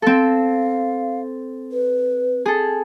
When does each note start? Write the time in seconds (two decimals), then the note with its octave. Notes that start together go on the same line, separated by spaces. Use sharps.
0.02 C4 A4 F5
1.71 B4
2.46 G#4 A4